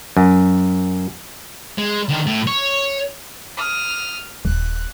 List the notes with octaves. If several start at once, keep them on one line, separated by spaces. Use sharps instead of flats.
F#2
G#3
D3 D#3
A2
C#5
D#6 F6
D#1 F#6